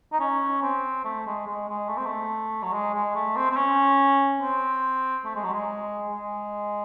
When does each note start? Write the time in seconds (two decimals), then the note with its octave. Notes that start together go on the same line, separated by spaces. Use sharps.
0.12 D#4
0.20 C#4
0.62 C4
1.05 A3
1.26 G#3
1.46 G#3
1.68 G#3
1.88 A3
1.97 C4
2.06 A3
2.63 F#3
2.72 G#3
2.94 G#3
3.15 A3
3.36 C4
3.51 C4
3.56 C#4
4.41 C4
5.25 A3
5.35 G#3
5.44 F#3
5.53 G#3
6.10 G#3